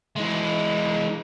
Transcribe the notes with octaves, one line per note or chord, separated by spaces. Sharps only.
E3 G#3